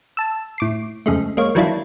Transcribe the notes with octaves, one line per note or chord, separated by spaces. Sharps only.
A5 E6
A2 D6 C7
F2 C#3 G#3 A3
G#3 A#3 C#5
D#3 E3 F#3 D4 E4 F4